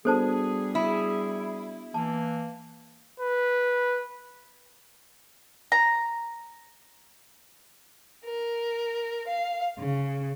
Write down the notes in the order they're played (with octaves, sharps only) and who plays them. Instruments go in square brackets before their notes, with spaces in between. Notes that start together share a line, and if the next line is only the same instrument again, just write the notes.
[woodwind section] G3 G#4 [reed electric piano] B3 D4 F#4 [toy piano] A4 C5 A5
[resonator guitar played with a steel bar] E4
[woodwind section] E3 A#3 [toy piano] A5
[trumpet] B4
[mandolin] A#5
[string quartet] A#4
F5
C#3